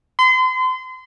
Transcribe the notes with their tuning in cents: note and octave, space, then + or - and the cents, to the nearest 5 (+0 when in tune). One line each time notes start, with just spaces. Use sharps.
C6 -35